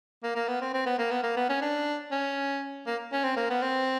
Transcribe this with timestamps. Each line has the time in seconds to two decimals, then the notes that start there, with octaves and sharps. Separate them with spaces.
0.23 A#3
0.35 A#3
0.48 B3
0.61 C4
0.73 C4
0.86 B3
0.99 A#3
1.11 B3
1.23 A#3
1.37 B3
1.49 C#4
1.62 D4
2.11 C#4
2.87 A#3
3.12 C#4
3.24 C4
3.36 A#3
3.50 B3
3.62 C4